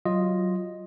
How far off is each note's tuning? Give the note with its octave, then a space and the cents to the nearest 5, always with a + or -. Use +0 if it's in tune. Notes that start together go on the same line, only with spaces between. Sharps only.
F#3 +15 F4 +0 D#5 +0